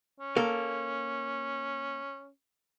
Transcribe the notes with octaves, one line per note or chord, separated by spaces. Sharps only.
C#4
A#3 A4